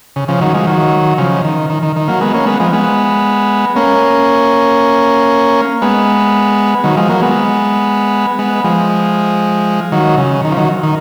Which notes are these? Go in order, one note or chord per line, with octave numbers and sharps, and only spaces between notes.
C#3
C#3 F3
D#3 F#3
F3 G#3
D#3 F#3
C#3 F3
D#3
D#3
D#3
D#3
F#3 A#3
G#3 B3
A#3 C#4
G#3 B3
F3 G#3
G#3 B3
A#3 C#4
G#3 B3
D#3 F#3
F3 G#3
F#3 A#3
G#3 B3
G#3 B3
F3 G#3
D#3 F#3
C#3
D#3
F3
D#3 F#3
D#3